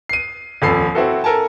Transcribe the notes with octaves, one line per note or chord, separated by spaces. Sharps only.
C7 D#7
D#1 F2 A4 B5 C7
C4 E4 F#4 A4
A4 A#4 G#5 A5